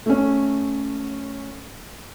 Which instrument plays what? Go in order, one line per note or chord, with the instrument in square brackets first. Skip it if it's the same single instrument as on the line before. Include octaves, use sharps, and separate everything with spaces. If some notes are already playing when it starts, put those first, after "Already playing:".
[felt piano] A3 C#4